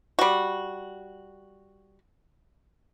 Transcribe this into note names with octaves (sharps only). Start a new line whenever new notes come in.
G3 F#4